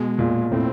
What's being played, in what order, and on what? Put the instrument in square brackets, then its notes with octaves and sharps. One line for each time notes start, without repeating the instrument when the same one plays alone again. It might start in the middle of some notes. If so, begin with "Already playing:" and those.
Already playing: [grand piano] B2 [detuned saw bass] G#3
[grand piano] A#2
[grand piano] A2 [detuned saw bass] C4